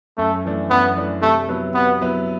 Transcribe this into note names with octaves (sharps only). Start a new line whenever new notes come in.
F#2 A3
E3 A3 D4
F#2 B3
E3 A3 D4
C3 A3
F#3 B3 E4 B4
C3 B3
F#3 B3 E4 B4